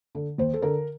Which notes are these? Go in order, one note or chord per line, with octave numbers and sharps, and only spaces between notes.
D3
D#2 C5
A4
D3 A#4